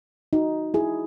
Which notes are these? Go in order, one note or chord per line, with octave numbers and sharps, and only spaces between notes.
D#4 F#4
E4 G#4